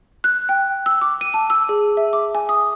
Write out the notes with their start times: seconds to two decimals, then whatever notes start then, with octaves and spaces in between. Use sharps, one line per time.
0.24 F#6
0.49 G5
0.86 E6
1.01 D6
1.21 D#7
1.34 A5
1.50 E6
1.69 G#4
1.97 E5
2.13 D6
2.35 G#5
2.49 D#6